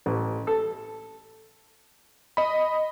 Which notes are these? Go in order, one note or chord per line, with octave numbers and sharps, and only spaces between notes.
A1
A4
D#5 B5